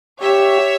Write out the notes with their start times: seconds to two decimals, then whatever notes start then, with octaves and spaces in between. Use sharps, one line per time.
0.22 G4 C#5 E5